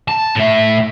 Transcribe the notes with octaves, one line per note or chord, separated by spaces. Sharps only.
A5
A2 E5